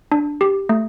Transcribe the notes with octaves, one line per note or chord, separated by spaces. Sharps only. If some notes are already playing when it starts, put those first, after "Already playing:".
D4
G4
A3